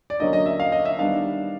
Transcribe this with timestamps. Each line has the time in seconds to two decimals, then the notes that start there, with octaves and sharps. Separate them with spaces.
0.10 D5
0.20 D3 F#3 A#3 C#4 D#5
0.33 D#5
0.46 E5
0.60 F5
0.72 D#5
0.85 E5
0.99 D#3 G3 B3 D4 F5